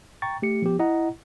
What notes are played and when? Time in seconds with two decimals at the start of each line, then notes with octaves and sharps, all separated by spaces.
0.22 G5 A#5 C#6 A6
0.42 A3 G4 C#7
0.62 F3 B3 G4
0.79 E4 D#5 F#5 A#5